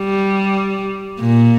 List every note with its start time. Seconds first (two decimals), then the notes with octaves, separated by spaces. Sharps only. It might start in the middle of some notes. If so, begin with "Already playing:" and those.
Already playing: G3
1.20 A#2